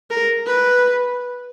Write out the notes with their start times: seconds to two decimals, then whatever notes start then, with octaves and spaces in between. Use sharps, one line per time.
0.10 A#4
0.47 B4